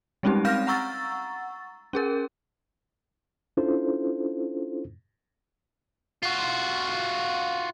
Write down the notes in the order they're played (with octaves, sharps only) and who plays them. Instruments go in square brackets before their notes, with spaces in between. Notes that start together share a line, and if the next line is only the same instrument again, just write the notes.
[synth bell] G3 G#3 C4 C#4 D#4 G4
C4 F5 F6 G6 A#6
F#5 A#5 C#6 E6 A6
C#4 G#4 A#4
[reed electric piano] C#4 D4 E4 F4 A4 C5
[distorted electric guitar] F4 F#4